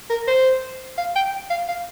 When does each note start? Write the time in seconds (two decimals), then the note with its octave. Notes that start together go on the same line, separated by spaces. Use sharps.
0.10 A#4
0.28 C5
0.98 F5
1.16 G5
1.50 F5
1.68 F5